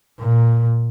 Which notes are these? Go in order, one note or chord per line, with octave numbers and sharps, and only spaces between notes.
A#2